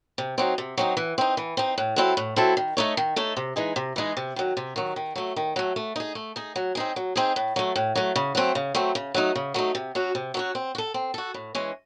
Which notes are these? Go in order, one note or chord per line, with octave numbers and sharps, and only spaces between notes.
C3
F#3 C4 D#4
C3
F#3 C4 D#4
E3
C4 D#4
E3
C4 D#4
A2
F#3 C4 E4 A4
A2
F#3 C4 E4 A4
D#3
A3 D#4 A4 C#5
D#3
A3 D#4 A4 C#5
C3
E3 G#3 D#4 G#4
C3
E3 G#3 D#4 G#4
C3
D#3 F#3
C3
D#3 F#3
D#3
F#3 A3
D#3
F#3 A3
A3
D#4 G#4
A3
D#4 G#4
F#3
C4 D#4 G#4
F#3
C4 D#4 G#4
A2
F#3 A3
A2
F#3 A3
C#3
F#3 A3 C4
C#3
F#3 A3 C4
C#3
F#3 A3 D#4
C#3
F#3 A3 D#4
C3
F#3 C#4 F#4
C3
F#3 C#4 F#4
C4
F#4
A4
C4
F#4 A4
A2
E3 G#3 C#4